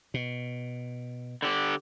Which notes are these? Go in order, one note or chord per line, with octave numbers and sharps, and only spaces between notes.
B2
D3 G4